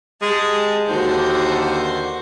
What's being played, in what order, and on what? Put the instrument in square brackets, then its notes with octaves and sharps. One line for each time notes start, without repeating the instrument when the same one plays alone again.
[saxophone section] G#3 [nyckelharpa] G4 A5
[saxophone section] D#2 D3 [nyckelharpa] F#4 C5